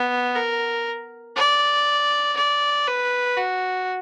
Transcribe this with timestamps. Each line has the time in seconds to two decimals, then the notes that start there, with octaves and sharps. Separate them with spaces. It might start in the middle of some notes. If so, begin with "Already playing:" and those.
Already playing: B3
0.35 A#4
1.36 D5
2.37 D5
2.87 B4
3.37 F#4